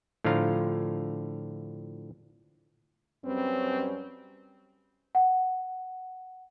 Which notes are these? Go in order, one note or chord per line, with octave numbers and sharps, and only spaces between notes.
A2 D3 F3 F4 F5 A#5
F#2 G3 C4 C#4 B4
F#5